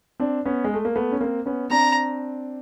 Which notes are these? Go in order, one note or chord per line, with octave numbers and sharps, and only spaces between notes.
C4 D4
B3 C#4
G#3
A3
A#3
A3 B3
C#4
A#3 C4
B3 C#4
C4 D4 A#5